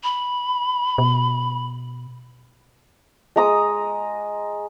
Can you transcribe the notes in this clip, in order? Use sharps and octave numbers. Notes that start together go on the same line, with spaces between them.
B5
B2
G#3 A#5 D#6